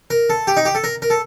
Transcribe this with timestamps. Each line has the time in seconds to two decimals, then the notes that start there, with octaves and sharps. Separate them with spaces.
0.10 A#4
0.30 A4
0.47 G4
0.57 D#4
0.65 G4
0.75 A4
0.84 A#4
1.02 A#4
1.10 A4